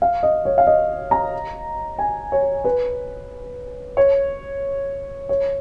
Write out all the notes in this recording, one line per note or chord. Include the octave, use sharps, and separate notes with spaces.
F5
D#5
C#5
F5
D#5
A#5
G#5
C#5
B4
C#5
C#5